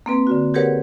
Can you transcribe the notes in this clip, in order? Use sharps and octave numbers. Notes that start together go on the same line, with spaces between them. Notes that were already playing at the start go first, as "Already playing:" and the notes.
A#3 C4 B4
D3 F#4
G4 G#4 A#4 B4 C#5 F#5